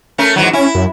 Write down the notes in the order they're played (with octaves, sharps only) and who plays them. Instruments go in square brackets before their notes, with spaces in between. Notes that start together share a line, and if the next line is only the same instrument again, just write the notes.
[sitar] A3 C#4 A#4
G#2 E3 F#3
[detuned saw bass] C#4 [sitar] E4
[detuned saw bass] F#2